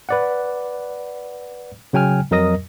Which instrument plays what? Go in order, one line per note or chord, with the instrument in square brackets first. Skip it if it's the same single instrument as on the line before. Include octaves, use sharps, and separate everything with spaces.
[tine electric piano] B4 D5 F#5
C#3 F#3 G5 G#5 F6
F2 F#3 A#4 D#5 D#6 A#6